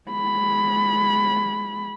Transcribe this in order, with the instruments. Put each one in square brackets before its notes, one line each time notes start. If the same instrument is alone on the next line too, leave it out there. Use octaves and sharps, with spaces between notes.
[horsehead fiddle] G#3 B5